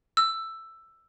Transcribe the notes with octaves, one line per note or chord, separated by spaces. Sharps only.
E6